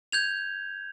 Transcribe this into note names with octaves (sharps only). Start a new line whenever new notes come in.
G6 G#6 F7